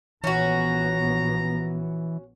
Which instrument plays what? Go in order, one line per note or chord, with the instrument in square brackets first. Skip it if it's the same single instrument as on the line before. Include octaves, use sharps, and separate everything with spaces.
[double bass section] A#1 B3 [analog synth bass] E3 [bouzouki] C#4 F#4 [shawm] A#5